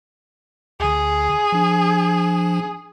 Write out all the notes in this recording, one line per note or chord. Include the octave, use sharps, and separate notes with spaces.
D2 D3 G#4
F3 D4